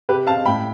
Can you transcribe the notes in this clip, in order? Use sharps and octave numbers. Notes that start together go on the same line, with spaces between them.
C3 G4 B4
C4 F5 A5
A2 G5 B5